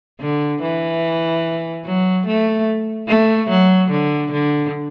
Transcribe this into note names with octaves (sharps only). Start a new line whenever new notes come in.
D3
E3
F#3
A3
A3
F#3
D3
D3